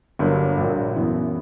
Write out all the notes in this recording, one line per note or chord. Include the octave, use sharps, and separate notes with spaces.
G1 G2 F#3 A#3
A#1 A#2 F#3
F#2 E3 B3 E4